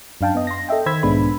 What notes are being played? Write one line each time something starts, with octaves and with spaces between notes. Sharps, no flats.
F#2 D4 F5 G5 A5
B3 D#5
C6 A#6
A4 D#5 E5 G5
D#3 C5 B5 E6 G#6 B6
B1 G#2 G#3 B3 D4 B5